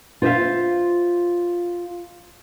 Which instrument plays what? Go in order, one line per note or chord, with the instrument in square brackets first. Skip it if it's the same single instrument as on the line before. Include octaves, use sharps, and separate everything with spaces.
[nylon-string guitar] F4 C5 D5 E5 F5